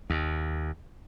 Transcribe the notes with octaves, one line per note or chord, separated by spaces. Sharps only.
D#2